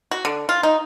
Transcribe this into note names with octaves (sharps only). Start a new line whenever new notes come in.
F#4
D3
F4
D#4